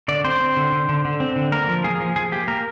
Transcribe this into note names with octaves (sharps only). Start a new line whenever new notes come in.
D3 D5
C4 C5
C4
D3
D3
D3
D3
C4
D3
A#3 A#4
F3
A#3 G#4
F3
F3 G#4
A#3 G4
A#3 A#4